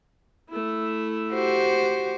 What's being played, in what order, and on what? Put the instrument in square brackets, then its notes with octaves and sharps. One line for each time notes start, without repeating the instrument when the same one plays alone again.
[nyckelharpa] A3 E4
[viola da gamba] F#4 G4 C5